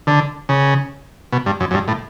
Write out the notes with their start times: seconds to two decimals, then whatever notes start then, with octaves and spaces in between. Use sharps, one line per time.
0.07 D3
0.49 C#3
1.32 B2
1.46 G2
1.60 F#2
1.71 F#2
1.74 G2
1.88 A2